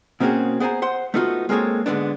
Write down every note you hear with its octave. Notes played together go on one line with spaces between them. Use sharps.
B2 A#3 C4 C#4 F#4 G#4
B3 G#4 C5 G#5 A#5
C5 F#5 C6
A3 B3 D#4 F4 F#4
G#3 A#3 C4 G#4 A4 C#5
G#2 D3 D#3 G#3 B3 D4